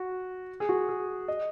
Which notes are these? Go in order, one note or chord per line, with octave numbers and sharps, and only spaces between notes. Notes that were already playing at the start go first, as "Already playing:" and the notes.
Already playing: F#4
G#4
F#4
G#4
D#5